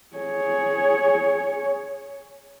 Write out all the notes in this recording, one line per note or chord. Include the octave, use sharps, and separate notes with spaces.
G#4 C#5